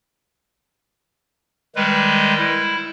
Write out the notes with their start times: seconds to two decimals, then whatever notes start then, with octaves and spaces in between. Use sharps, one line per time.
1.76 D#3 G3 G#3 B4
2.38 E4